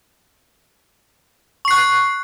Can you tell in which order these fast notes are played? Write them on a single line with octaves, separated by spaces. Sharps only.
C#6 C7 F#6